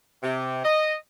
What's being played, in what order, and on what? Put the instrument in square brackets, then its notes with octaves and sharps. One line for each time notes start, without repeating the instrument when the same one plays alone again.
[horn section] C3
D#5